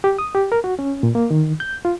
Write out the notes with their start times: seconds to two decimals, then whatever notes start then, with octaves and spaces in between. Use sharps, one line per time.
0.04 G4
0.19 D#6
0.35 G4
0.52 A#4
0.64 F#4
0.79 C#4
1.03 A#2
1.15 A#3
1.31 D#3
1.60 G6
1.85 F4